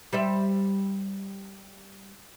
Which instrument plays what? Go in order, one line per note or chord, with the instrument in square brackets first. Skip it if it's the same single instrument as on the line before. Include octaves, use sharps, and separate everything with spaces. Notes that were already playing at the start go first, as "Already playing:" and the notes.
[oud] G3 C5 E5